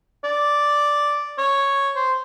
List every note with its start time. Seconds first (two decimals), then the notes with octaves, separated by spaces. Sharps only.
0.24 D5
1.38 C#5
1.96 C5